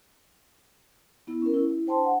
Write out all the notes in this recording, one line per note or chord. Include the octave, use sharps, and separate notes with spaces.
B3 E4
C#4 A#4
E4
E4
D4 C5 G5 A5 C6
F#5